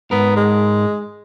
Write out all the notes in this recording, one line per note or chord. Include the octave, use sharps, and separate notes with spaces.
G#2 B3 A#4
G#3